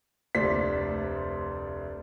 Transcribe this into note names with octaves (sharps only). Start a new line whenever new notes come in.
F1 D2 C5 D5 B6